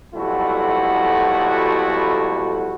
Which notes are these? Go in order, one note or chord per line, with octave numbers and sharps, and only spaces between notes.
B1 F2 G3 A3 E4 F#4